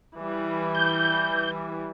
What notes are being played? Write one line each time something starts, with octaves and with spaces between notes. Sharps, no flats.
E3 G3
G6